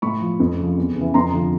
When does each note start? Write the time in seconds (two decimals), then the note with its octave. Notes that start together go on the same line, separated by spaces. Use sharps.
0.02 A2 B5 C#6
0.21 F3
0.40 F2
0.58 C#3 F3
0.77 E2
0.96 C#3 E3
1.14 F2 A#5 C6
1.34 D3 F3